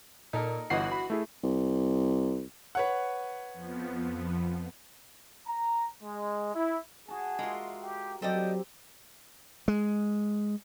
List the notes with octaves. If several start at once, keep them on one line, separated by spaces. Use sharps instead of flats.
A#2 D#4 A4 A#4
G1 E3 F#4 D#5 F#5 C7
B5
A3 E4 G#4
C2
B4 C#5 F#5
F2 F3 B3
A#5
G#3
E4
F#4 G#4 A5
G#3 F4 A#4 D5 E5
G4
F#3 C4 G4 A4 D5 D#5 G5
G#3